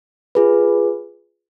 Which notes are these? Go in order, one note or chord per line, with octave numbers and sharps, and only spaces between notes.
F4 G#4 B4